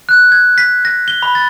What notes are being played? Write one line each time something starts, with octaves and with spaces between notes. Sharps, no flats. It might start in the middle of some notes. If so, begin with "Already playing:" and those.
F#6
G#6
B6
A#6
G7
B5
A6